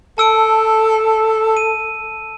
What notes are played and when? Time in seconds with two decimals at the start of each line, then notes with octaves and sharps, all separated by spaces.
0.18 A4 A5 E6 D7
1.57 D#7